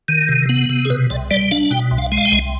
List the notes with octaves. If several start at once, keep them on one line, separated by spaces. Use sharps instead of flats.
D#3
C3
B3
C3
G#4
B2 B4
C2 D5
G3 D5
D4 F5
B2 G5
C2
F5
G#3
F5
G5
C2